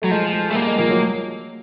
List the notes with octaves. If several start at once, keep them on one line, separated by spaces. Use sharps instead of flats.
F#3 A3
F3 G#3
G#3
A3
G3 A#3
G#3
F3 A#3
F#3